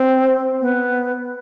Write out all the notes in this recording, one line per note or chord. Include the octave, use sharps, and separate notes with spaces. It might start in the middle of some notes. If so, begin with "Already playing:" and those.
Already playing: C4
B3